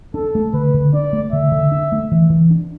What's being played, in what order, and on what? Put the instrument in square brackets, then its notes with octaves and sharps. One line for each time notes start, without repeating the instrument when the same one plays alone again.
[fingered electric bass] D4 [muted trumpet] A4
[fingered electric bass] A3
[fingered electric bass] D3 [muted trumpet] B4
[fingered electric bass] D3
[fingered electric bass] D4 [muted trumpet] D5
[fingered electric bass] A3
[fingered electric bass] D3 [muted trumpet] E5
[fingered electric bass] D3
D4
A3
E3
E3
D4